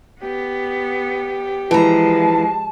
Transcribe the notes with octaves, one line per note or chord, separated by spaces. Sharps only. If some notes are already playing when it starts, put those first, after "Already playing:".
B3 G4
E3 F3 G#3 A5 A#5